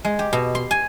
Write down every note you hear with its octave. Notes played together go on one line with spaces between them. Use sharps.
G#3
G4
B2
C6
G#5